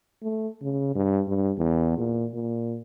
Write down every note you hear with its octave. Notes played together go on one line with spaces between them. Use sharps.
A3
C#3
G2
G2
E2
A#2
A#2